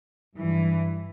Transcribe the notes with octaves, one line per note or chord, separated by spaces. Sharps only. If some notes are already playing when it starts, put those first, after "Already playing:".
G2 E3